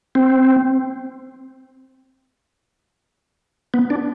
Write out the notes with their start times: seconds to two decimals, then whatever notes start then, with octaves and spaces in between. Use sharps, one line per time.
0.15 C4
3.74 B3
3.90 D4